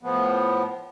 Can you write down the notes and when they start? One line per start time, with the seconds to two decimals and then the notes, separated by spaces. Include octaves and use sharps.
0.03 A2 F3 B3